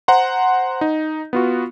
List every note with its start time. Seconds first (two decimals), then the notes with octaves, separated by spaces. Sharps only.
0.08 C5 F#5 A#5 C6
0.81 D#4
1.33 B3 F4 F#4